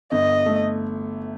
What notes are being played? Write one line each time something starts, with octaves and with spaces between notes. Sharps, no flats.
G1 D#5
A3